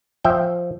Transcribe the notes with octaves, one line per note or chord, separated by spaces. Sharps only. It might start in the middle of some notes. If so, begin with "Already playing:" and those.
F3 E5 G5